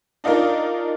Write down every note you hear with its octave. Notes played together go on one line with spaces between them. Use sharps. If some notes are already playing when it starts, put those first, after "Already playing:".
D4 D#4 F4 A#4 D5